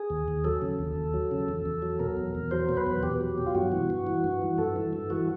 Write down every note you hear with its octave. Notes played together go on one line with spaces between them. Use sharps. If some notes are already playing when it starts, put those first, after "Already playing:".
Already playing: G#4
D#2
D#2
F#3 A4
C#3
D#2
D#2
F#3
C#3
E2
E2
F#3
B2 A#4
E2
E2
F#3 C5
B2
B4
E2
E2 G4
F#3
B2
F4
G2 F#4
E3
G2
E3
G2
E3
G2 A4
E3
G2
E3 F#4